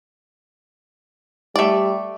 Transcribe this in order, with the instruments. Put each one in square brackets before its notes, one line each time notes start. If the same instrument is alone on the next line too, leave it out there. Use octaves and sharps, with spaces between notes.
[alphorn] G3 [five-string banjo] A3 D5